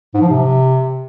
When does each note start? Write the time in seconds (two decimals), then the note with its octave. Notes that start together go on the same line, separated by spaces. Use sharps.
0.14 G#2
0.21 F3
0.28 C3